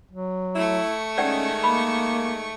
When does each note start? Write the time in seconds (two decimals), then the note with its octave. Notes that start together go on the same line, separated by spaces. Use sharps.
0.11 F#3
0.56 A3 E4 C#6
1.18 D#3 G#3 C#4 D5 F#5 G5
1.64 A#3 B5